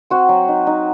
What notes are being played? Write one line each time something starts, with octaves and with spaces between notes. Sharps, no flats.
C4 F#4
F#3
D#4
D#4